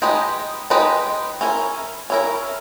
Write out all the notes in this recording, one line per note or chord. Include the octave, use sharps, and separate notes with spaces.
G#3 D#4 G4 B4 D#5
G#3 D#4 G4 B4 D#5
C#4 E4 A#4
C#4 E4 A#4